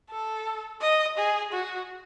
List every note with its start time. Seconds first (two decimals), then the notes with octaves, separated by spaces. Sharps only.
0.11 A4
0.81 D#5
1.17 G#4
1.53 F#4